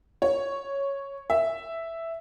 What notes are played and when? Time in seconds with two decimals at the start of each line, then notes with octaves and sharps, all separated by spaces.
0.22 C#5
1.30 E5